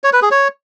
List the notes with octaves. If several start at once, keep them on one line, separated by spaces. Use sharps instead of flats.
C#5
B4
G#4
C#5